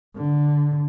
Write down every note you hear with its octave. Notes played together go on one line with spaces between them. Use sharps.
D3